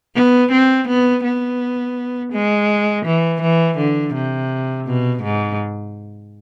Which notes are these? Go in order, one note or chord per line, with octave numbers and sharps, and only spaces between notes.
B3
C4
B3
B3
G#3
E3
E3
D3
C3
B2
G#2